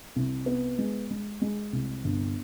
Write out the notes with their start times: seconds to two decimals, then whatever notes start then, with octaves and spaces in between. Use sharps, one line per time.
0.16 C2
0.46 B3
0.79 G#3
1.11 G#3
1.42 G#3
1.73 C2
2.04 G1